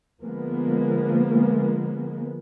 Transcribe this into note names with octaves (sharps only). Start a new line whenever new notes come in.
D3 F3 G#3 A#3 B3